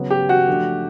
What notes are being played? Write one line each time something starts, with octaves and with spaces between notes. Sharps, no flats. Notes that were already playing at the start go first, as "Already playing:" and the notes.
Already playing: C#3 F#3 B3
G4
F#4
F3 A3 D4